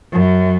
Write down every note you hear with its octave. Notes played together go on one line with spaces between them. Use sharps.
F#2